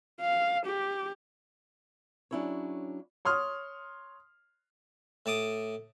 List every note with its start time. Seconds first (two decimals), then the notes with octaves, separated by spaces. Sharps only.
0.21 F5
0.66 G4
2.31 F#3 C#4 D4 E4 G#4 C#5
3.25 C#5 C6 D#6 F6
5.26 A2 A5 D6 D#6